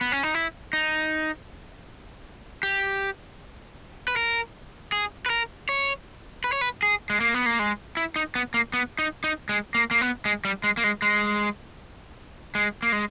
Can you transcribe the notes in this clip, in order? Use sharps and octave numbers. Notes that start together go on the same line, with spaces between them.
B3
C#4
D#4
E4
D#4
G4
B4
A#4
G#4
B4
A#4
C#5
B4
C#5
B4
G#4
G#3
A#3
B3
A#3
G#3
E4
D#4
B3
A#3
B3
D#4
D#4
G#3
A#3
A#3
B3
G#3
G3
G#3
A#3
G#3
G#3
G#3
A#3
G#3